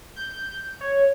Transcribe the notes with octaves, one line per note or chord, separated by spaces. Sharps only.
G6
C#5